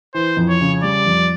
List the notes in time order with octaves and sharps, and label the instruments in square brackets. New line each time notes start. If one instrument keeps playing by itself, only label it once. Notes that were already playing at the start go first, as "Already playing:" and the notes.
[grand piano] E3 [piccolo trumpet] C5
[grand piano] F2
[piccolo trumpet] C#5
[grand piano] C#3
[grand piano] G3 [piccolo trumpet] D5
[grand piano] F2